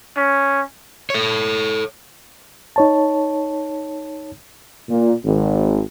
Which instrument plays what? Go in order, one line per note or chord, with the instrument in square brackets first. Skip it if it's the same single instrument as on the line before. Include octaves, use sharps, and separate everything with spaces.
[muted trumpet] C#4
[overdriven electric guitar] A4 C#5
[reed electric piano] D#4 C#5 A5
[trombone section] A#2
G#1